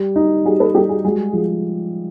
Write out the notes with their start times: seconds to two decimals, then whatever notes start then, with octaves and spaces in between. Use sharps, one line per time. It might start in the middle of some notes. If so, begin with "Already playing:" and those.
Already playing: G3
0.16 D#4
0.45 G3 F#4 G#4
0.60 A4 B4
0.75 G3 G4 A4
0.89 F#4 G#4
1.04 G#3 F#4 G#4
1.33 F3